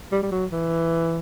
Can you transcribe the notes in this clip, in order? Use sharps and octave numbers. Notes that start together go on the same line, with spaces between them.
G3
G3
F#3
E3